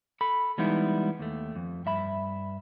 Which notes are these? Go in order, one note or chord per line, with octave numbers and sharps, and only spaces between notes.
A4 B5
E3 G3 G#3 B3 D#4 E4
D#2 A3
F2
G2 E5 B5